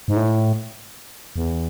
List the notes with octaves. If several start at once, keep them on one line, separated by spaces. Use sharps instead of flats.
G#2
A2
E2